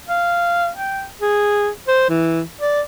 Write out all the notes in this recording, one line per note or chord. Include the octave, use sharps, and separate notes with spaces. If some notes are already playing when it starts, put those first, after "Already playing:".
F5
G5
G#4
C5
E3
D5